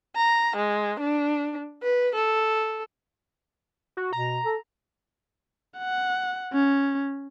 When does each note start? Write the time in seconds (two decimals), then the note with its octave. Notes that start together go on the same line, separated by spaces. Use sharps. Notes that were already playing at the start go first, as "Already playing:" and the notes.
0.16 A#5
0.56 G#3
1.00 D4
1.83 B4
2.15 A4
3.97 F#4
4.13 B2 A#5
4.45 A4
5.79 F#5
6.53 C#4